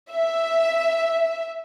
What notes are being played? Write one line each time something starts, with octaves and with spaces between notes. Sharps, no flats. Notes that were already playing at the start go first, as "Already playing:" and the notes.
E5